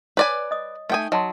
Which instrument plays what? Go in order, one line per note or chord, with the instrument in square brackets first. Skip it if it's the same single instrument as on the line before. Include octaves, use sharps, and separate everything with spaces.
[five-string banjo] B4 D5 G#5 [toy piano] C#5
[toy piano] D#5 D#6
[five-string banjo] A3 G5 G#5 [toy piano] D#4 D#6
[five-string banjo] F#3 [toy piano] D#5 A5 C6